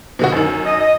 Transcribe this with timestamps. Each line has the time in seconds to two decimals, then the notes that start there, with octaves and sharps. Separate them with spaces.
0.19 B2 D3 F#4
0.32 F#2 D#3
0.65 D#5
0.79 D#5